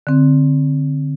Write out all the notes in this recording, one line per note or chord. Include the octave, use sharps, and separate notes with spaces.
D3 C4